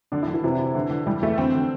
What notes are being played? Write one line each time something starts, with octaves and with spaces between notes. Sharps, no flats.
D3 D4
E4
D3
E3
C3 E3
E4
D3
D3
E3 G3
E3 A3
D3 C4
D3